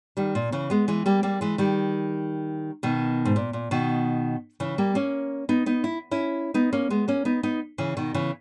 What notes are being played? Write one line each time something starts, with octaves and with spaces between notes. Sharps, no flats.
D#3 G3
A#2
C#3 E3
G#3 B3
E3 G#3
G3 A#3
G3 A#3
E3 G#3
D#3 G3
B2 D#3
G#2
A#2
A#2
B2 D#3
C#3 E3
G3 A#3
A#3 C#4
B3 D#4
B3 D#4
E4
C#4 E4
B3 D#4
A#3 C#4
G#3 B3
A#3 C#4
B3 D#4
B3 D#4
C#3 E3
B2 D#3
C#3 E3